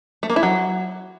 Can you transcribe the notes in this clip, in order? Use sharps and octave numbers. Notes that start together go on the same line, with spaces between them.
A3
A#3
E4
F#3